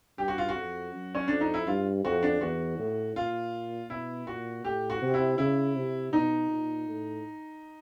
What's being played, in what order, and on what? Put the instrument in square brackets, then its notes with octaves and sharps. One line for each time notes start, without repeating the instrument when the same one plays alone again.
[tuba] G2 [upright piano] G4
[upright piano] F#4
F4
F#4
[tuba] F2
F#2
[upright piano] C#4
[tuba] F2 [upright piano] D4
[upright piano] D#4
E4
[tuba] G2 [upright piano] F4
[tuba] F2 [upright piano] F#4
[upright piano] D4
[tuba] E2 [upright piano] F#4
[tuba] A2
[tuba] A#2 [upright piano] F4
[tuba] B2 [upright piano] E4
[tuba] A#2 [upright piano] F#4
[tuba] A2 [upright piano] G4
[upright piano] F#4
[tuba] C3
[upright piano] E4
[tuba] C#3 [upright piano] E4
[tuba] C3
[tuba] B2 [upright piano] D#4
[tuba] A#2
A2